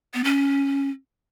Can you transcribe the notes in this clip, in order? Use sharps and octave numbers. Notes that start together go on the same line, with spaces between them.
B3
C#4